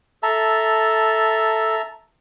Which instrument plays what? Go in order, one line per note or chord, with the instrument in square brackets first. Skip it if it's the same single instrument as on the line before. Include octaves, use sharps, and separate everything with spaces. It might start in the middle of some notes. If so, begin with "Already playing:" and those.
[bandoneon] A4 [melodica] E5 A5 A#5